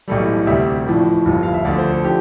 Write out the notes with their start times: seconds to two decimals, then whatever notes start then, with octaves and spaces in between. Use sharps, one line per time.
0.08 B1 A2 E3 G3 A4
0.47 D2 C3 G3 E5
0.87 A1 A2 F3
1.25 G1 G2 F3
1.43 F5
1.54 E5
1.65 D2 D3 F3 D5
1.78 C5
1.91 A4
2.04 D3 F3 G4